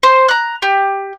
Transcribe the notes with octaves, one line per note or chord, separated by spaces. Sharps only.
C5
A#5 F#6
G4